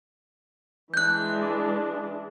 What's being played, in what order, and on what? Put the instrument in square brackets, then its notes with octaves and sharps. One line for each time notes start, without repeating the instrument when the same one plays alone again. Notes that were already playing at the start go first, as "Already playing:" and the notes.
[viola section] E3 G#3 D4 [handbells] F#6 G6